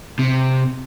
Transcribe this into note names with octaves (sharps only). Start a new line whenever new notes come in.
C3